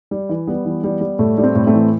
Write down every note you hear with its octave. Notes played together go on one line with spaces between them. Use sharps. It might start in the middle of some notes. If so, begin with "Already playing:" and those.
G3
E3
G3 B3
E3
G3
G3
A2 A3
G3 D4
A3 C4
A2
A3 C4
E3